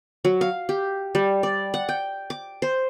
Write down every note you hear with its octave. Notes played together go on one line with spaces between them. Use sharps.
F#3
F5
G4
G3
D5
F#5
G5
D6
C5